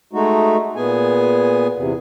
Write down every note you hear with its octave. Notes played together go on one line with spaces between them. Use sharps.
G#3 A3 D#4 F#4
A#2 B3 G#4 G#5
E2 C3